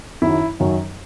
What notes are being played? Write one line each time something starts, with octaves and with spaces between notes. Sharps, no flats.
F#2 D#3 F#3 E4
F#2 D#3 F#3